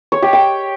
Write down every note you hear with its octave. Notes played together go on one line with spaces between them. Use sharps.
C#5
G4
G5